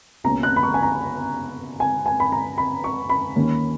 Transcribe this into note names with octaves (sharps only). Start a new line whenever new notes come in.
C#2 B2 A#3 C#4 A#5
F#6
B5
C#6
G#5
A#5
G#5
G#5
B5
A#5
B5
C#6
B5
D#2 D#3 A#3 C#4